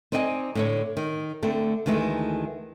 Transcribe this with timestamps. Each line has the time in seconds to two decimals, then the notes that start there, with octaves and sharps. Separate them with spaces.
0.12 C4 D#4 D5 D#5 G5 G#5
0.55 A2 D3 C#5
0.97 D#3
1.43 D3 A3 C4
1.86 D2 D#3 E3 G#3 A3